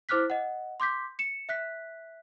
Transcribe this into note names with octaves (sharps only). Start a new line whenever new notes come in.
E4 C5 D6 F6 F#6 B6
D#5 F#5
C6 D6 G6 B6
C#7 E7
E5 F#6 B6